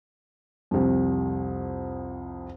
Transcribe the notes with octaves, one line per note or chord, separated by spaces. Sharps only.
C2 F2